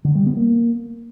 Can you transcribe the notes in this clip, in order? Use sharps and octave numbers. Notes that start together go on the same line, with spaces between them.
D3
G3
B3
A#3